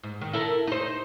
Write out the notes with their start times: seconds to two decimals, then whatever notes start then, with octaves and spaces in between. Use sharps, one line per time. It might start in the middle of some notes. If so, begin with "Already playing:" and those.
0.03 G#2
0.21 D#3
0.33 E4 A4 A#4
0.67 D#4 C5